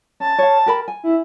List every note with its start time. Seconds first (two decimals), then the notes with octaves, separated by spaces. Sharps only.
0.20 C#4 A5
0.39 C#5 F5
0.66 G4 A#4 B5
0.88 G#5
1.04 E4